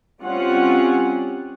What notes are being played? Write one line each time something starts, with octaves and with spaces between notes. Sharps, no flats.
G3 C4 C#4 F4 F#5